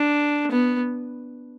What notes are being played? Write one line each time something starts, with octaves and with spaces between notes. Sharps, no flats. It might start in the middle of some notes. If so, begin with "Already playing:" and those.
Already playing: D4
B3